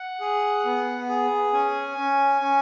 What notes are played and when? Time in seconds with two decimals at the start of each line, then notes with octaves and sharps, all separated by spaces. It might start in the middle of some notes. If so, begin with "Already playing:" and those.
Already playing: F#5
0.21 G#4
0.65 B3
1.09 G#4
1.53 C#4 G#5
1.98 C#4
2.42 C#4